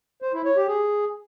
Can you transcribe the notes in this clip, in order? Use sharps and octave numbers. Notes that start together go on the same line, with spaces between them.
C5
E4
C#5
G4
G#4